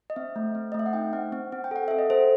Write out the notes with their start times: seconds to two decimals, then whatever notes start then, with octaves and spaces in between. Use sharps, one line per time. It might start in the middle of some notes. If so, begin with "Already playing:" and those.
0.10 D#5
0.16 C4 E5
0.36 A3
0.55 C4
0.72 D#5
0.74 A3 E5
0.86 F#5
0.93 D#4 G5
1.13 C4 F#5
1.32 C4
1.52 C4
1.64 G5
1.71 A4 F#5
1.88 A4 E5
1.99 D#5
2.10 A4 C5